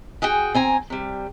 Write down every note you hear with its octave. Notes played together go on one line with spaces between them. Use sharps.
F#4 G#4 F#5 G5
C4 G#5 A#5
C3 G3